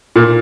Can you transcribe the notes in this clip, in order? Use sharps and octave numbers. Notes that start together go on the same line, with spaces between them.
A#2